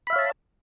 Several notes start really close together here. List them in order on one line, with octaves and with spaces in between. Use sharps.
B5 E5 F5 C#5 A5